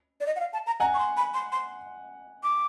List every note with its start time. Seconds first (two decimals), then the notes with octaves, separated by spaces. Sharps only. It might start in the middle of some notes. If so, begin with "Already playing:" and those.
0.21 D5
0.26 D#5
0.36 F#5
0.40 F5
0.53 A5
0.67 A#5
0.80 F#5 G#5 A#5
0.94 C#6
0.99 C6
1.17 B5
1.34 C6
1.52 C6
2.43 D6